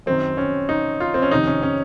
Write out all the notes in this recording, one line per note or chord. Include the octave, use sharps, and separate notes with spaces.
F#2 D#3 C4
C#4
D#4
F4
C4
C#4
F2 C3 D#3 D#4
C#4
C#4